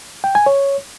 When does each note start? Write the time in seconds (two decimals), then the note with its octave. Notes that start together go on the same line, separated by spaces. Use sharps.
0.24 G5
0.35 G#5
0.46 C#5